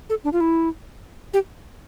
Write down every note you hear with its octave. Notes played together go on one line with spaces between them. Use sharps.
A4
D4
F4
E4
G4